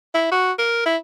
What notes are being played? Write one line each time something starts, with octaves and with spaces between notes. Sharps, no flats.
E4
F#4
A#4
E4